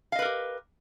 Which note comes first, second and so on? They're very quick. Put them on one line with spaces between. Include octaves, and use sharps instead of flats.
F5 D#5 B4 A#4 G4